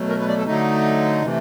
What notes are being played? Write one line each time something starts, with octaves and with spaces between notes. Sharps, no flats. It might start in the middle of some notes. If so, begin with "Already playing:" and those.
Already playing: B2 F#3 A3
A#4
B4
D5
A4
D3 F#3 A3 D#4
C3 E3 A3